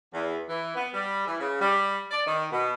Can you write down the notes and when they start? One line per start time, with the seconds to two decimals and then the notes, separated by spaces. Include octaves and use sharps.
0.13 E2
0.48 E3
0.75 B3
0.93 G3
1.26 E3
1.39 C#3
1.60 G3
2.11 D5
2.25 D#3
2.51 B2